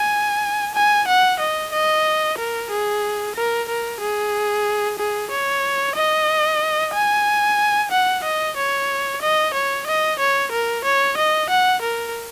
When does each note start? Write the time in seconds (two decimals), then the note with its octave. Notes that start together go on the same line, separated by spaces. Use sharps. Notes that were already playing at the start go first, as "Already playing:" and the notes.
Already playing: G#5
0.75 G#5
1.08 F#5
1.39 D#5
1.73 D#5
2.38 A#4
2.70 G#4
3.36 A#4
3.68 A#4
4.00 G#4
4.99 G#4
5.31 C#5
5.96 D#5
6.94 G#5
7.91 F#5
8.24 D#5
8.57 C#5
9.22 D#5
9.54 C#5
9.87 D#5
10.19 C#5
10.52 A#4
10.85 C#5
11.17 D#5
11.50 F#5
11.82 A#4